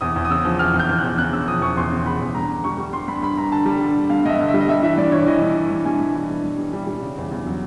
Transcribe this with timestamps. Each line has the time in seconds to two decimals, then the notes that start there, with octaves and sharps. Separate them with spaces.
0.01 E2 D#6
0.16 E2
0.25 D#6
0.30 C#3 E6
0.45 F3
0.59 E2 F6
0.74 E2
0.79 G6
0.89 E2
0.98 F#6
1.03 E2
1.18 C#3 F#6
1.33 C#3 E6
1.48 F3 D#6
1.61 E2 C#6
1.77 E2 C6
1.92 C#3
2.06 E2 B5
2.20 E2
2.35 G2 A#5
2.50 D3
2.64 G3 C#6
2.78 G3
2.93 G2 C6
3.08 G2 B5
3.22 G2 B5
3.37 G2 A#5
3.51 D3 A5
3.66 G3
3.80 D3
3.96 D3
4.10 G2 F5
4.25 G2 D#5
4.29 E5
4.40 D3
4.48 E5
4.54 G3
4.61 D#5
4.68 G2 E5
4.83 E3 E5
4.98 G2 D5
5.12 E3 C#5
5.26 E3 D#5
5.42 G2
5.56 G2
5.71 G2
5.85 G2 G#5
6.01 G2
6.15 E3
6.30 G2
6.44 G2
6.58 G3
6.73 G3
6.87 G3
7.02 C#3
7.17 E2
7.31 E2
7.46 F#3